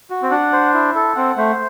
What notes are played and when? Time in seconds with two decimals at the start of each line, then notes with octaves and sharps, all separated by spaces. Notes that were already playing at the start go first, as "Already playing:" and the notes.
0.10 F#4
0.22 C4
0.31 D4 F#5
0.53 C5
0.74 E4
0.95 A4
1.16 C4 F#5
1.37 A3 C5